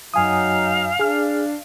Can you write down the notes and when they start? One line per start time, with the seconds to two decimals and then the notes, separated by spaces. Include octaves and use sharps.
0.14 F#2 F#3 D#4 F5 G#5 D#6
0.99 D4 G#4 F6